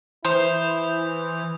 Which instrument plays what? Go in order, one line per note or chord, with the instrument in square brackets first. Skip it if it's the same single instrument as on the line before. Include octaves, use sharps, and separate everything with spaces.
[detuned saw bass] E3 [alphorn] E4 [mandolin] C5 [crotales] D#6 G6